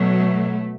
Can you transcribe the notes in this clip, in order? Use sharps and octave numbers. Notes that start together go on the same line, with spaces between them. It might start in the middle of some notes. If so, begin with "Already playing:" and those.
Already playing: B2 F#3 A3